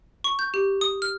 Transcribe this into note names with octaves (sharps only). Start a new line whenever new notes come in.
C#6
G6
G4
D#6
F6